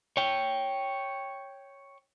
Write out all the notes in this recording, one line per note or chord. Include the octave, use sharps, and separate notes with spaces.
C#5 G5